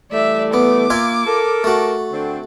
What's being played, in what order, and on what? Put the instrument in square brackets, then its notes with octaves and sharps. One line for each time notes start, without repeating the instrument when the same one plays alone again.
[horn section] E3 G3 A3 [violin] D5 E5
[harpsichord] B3 [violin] D6
[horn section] A#3 [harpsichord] F4 E5 G#5
[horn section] A4 A#4
[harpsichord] A3 F#4
[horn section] D3 C4